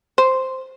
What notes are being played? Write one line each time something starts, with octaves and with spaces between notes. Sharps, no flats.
C5